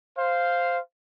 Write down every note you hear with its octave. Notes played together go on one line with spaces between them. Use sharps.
C5 F5